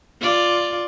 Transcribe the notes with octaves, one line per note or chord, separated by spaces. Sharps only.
F4 D5